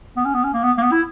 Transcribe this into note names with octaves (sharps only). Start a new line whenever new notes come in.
B3
C#4
B3
C#4
A#3
B3
A#3
B3
E4